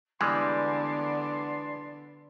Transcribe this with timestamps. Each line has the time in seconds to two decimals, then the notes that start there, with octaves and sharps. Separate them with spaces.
0.21 D3 E3 G3 G#3 B3 D5 C6